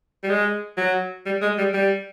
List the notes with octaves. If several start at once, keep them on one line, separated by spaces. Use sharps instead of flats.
G3
G#3
F#3
G3
G#3
G3
G3